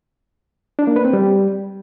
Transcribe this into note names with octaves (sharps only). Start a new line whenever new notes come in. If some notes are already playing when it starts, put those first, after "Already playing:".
D4
A#3
B4
C4
G3